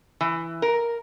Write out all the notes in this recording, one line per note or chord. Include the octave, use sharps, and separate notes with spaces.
E3
A#4